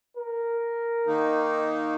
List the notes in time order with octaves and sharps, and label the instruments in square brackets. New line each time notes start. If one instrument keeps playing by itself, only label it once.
[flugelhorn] A#4
[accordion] D#3 A#3 D#4